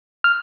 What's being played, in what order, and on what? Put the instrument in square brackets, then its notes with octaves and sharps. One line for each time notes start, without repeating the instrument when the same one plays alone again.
[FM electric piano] F6